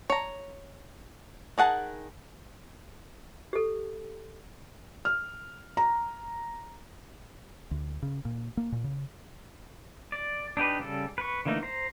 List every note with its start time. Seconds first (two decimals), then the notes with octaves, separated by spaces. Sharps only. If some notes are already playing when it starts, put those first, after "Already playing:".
0.10 C#5 A#5
1.58 D#3 G#4 F#5 A5
3.53 G4 A4
5.05 F6
5.77 A#5
7.71 D2
8.02 C#3
8.25 A#2
8.57 A#3
8.72 A#2
8.84 C#3
10.12 D5
10.57 D4 D#4 G4 B4
10.79 C#3 G3 A4
11.18 B4 C#6
11.45 D3 E3 A3 A#3 D#4
11.63 C5 A#5